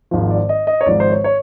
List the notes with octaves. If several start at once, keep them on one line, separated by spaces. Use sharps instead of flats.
G#1 G#2 F3
D5
D#5
D#5
C#5
G#1 G#2 F3 D5
C5
C#5
C#5